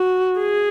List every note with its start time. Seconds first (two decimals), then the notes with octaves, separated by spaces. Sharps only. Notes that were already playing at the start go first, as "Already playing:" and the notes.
Already playing: F#4
0.39 G#4